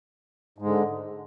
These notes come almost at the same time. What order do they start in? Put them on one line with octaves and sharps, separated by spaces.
G#2 G#3 D3